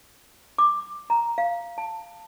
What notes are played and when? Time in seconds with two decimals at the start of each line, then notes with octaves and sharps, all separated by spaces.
0.58 D6
1.10 A#5
1.38 F5
1.78 A5